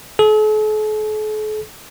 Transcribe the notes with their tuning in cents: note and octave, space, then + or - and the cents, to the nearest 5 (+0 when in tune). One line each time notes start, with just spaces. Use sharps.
A4 -45